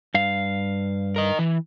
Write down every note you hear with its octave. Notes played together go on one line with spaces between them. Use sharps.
G2 F5
A#4 D#5
E3